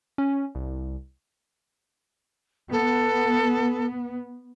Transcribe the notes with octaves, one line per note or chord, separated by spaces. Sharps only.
C#4
C2
B3 A4